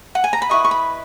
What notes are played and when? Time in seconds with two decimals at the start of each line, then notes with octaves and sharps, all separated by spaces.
0.15 F#5
0.24 G#5
0.33 A#5
0.42 B5
0.49 E4 G#4 B4 D#5 C#6
0.64 C#6
0.71 B5